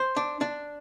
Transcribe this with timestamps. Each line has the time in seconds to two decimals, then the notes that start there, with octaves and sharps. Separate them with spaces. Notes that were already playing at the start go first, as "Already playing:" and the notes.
Already playing: C5
0.16 D4
0.41 D4